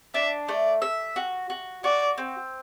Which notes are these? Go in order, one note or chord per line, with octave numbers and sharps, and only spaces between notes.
D4 E5
A3 D5
E5
F#4
F#4
F#4 D5
C4